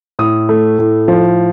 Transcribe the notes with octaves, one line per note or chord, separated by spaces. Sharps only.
A2 D#6
A3
A2
F3